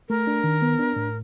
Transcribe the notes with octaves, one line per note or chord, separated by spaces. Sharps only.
A3 A#4
D4
D#3
B3
D4
A2